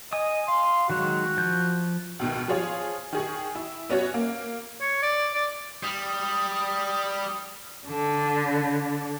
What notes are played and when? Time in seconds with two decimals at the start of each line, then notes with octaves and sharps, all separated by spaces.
0.13 D#5 G#5 D#6
0.48 F5 C6
0.90 D#3 F#3 G#3 F#4
1.37 F3 G6
2.19 C#2 B2 D#3
2.48 F3 F4 G#4 C#5
3.13 D#3 G#4 C#6
3.55 E4
3.89 B3 C#4 F#4 C#5
4.14 A#3
4.81 C#5
5.03 D5
5.35 D5
5.83 G3 D#6
7.90 D3